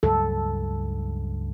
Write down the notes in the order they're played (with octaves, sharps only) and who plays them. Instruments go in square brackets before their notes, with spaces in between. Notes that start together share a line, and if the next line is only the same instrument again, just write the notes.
[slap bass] C#2 G2 F#3 [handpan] A4